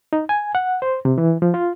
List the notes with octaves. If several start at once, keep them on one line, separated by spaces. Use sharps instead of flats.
D#4
G#5
F#5
C5
C3
E3
F3
F4